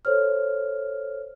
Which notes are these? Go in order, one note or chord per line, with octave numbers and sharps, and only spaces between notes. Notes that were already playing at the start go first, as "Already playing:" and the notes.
A4 C5 C#5 F6